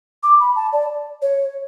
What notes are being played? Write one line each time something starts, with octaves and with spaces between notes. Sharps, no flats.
D6
B5
A5
D5
C#5